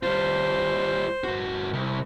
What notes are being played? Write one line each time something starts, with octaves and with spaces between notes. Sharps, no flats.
G3 F4 C5
G2 F#4
C2